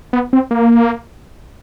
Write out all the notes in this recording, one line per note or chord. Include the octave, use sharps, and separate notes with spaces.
B3
C4
A#3